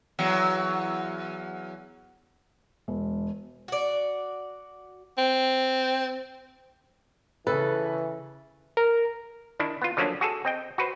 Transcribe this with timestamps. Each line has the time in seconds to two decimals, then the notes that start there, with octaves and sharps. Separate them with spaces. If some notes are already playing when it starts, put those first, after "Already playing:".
0.19 E2 F#3
2.88 E1
3.68 F#4 D5
5.18 C4
7.47 C#3 E3 A4 B4
8.77 A#4
9.59 D#3 D4 E4
9.82 B3 F4
9.97 D3 F3 F#3 A#3 C#4 D4
10.21 F#4 G#4 A4
10.45 C4 D#5 G5
10.78 F#4 B4 C5